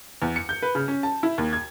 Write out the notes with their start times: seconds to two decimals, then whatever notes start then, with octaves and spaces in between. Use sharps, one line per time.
0.22 E2
0.36 C#7
0.49 G6
0.62 B4
0.75 C#3
0.88 C#4
1.03 A5
1.23 E4
1.38 D#2
1.53 G#6